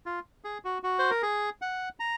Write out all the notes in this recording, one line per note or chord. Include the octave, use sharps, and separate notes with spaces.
F4
G#4
F#4
F#4
C5
A#4
G#4
F#5
A#5